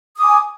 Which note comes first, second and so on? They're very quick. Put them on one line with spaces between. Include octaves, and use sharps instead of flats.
D#6 D6 G#5